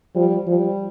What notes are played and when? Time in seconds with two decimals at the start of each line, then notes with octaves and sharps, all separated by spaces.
0.16 F3 G3
0.47 F3 G3